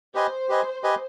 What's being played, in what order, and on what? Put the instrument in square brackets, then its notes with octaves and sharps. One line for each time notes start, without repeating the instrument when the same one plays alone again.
[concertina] G4 B4 D#5 G#5 [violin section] C5
[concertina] G4 B4 D#5 G#5
G4 B4 D#5 G#5